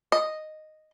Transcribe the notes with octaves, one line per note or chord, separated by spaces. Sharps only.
D#5